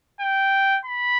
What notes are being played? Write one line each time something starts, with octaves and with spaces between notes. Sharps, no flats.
G5
B5